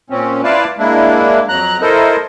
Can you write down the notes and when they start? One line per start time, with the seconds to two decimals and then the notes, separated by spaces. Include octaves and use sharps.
0.10 A#2 C4 C#4
0.44 E4 F4 B4 D5 F5 A5
0.78 G#3 A#3 D4 E4
1.49 F2 F#3 A#5 F#6
1.81 E4 A4 A#4 C5 D#5